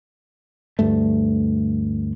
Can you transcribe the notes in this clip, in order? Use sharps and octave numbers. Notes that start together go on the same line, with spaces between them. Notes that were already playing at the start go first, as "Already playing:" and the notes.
D2 G2 A3